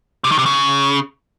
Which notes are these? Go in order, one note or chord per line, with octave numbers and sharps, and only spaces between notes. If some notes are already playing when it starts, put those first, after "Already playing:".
C3
D#3
C3
C#3